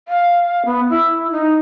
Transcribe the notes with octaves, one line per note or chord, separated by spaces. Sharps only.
F5
B3
E4
D#4